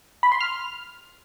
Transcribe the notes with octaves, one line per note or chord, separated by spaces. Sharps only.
B5
C6
F6